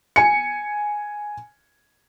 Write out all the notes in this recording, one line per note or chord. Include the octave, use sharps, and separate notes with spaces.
G#5 C#7